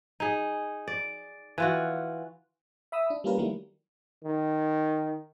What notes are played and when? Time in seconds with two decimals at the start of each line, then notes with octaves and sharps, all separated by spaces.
0.20 D#4 G#4
0.88 D5
1.58 E3 F4 F#4
2.92 E5 B5 D#6 E6
3.10 D4
3.24 G3 A#3 C#4 F4 A#4 B4
3.38 D#3 F#3 G3 A3 A#3 E4
4.24 D#3